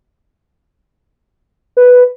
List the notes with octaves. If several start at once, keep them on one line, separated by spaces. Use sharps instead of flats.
B4